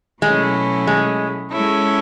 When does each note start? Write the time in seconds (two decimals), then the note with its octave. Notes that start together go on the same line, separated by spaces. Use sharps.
0.22 B2 F#3 G#3 A3 C#4 E4
0.87 G#3
1.52 G#3 C#4 E4 A4 C#5